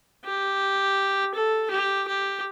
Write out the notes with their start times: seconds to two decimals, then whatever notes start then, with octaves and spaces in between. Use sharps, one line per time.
0.25 G4
1.34 A4
1.71 G4
2.08 G4